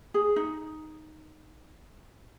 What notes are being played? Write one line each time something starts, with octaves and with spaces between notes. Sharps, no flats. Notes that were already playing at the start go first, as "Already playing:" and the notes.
G#4
D#4